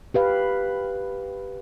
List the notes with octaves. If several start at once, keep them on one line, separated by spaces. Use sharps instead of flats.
G4 B4 F5